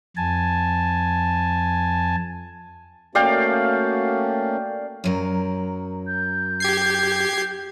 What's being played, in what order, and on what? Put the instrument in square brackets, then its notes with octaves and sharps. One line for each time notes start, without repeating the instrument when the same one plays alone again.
[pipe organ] F2 G#5 A5
[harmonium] A3 A#3 C#4 [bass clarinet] F#4 [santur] D5 F5 G5
[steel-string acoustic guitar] F#2 F#3 A#4
[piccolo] G6
[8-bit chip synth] G4 G#6 C7